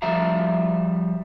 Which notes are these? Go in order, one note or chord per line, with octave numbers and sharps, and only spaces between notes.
F3 G3 E5 F5 A#5